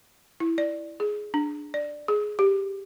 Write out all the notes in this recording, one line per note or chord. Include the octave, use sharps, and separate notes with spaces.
E4
D5
G#4
D4
D5
G#4
G4